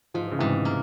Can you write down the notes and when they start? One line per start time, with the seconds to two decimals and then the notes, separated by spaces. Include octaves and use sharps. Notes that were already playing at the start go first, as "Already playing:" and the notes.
0.14 G#2 F3
0.22 E3
0.32 C#3
0.39 G#2 C3 E3
0.65 A#3